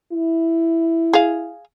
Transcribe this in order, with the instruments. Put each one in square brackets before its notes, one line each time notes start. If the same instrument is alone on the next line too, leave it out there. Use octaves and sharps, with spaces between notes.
[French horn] E4
[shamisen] G#4 F5